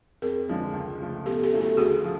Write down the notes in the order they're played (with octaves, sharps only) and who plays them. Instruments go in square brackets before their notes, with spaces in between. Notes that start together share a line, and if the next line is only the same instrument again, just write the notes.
[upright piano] F2 [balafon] G#4 A#4
[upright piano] D3 F3 G#3 C#4
C#2
C#3 F3 A3
[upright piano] B2 [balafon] G4 A4
[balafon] G4 A4
[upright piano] F#3 A3 C#4 E4
[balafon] G4 A4
[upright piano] D2 [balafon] F#4 G#4
[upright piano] C#3 F3